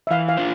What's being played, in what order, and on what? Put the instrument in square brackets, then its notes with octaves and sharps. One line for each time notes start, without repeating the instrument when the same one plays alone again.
[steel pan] E5
[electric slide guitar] E3 [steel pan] F5
[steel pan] F5
[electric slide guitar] D4 F4 C5